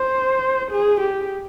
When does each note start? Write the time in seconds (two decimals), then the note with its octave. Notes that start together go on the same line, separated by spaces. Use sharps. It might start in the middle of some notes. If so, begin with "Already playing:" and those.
Already playing: C5
0.71 G#4
1.01 G4